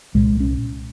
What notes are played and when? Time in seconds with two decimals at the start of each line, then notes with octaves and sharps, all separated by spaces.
0.14 C2 A#2 G#3
0.40 C#4